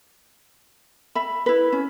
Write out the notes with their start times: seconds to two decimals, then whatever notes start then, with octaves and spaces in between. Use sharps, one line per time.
1.15 E5 B5
1.46 E4 B4
1.72 C#4